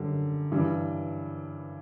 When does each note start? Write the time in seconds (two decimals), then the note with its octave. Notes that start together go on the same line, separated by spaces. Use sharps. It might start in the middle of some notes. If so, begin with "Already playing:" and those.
Already playing: F#2 D3 G3
0.51 G2 E3 G3